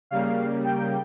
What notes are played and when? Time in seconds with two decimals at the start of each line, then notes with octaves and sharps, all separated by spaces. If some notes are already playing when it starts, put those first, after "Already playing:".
0.11 C#3 G3 A#3 F5
0.64 G5